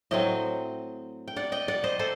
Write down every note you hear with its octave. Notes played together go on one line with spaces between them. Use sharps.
A2 F#3 C4 D#5 G5
G5
D5 F#5
D#5 G5
D5 F#5
C5 D#5
A4 C5